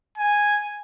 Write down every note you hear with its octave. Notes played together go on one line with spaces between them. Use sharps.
G#5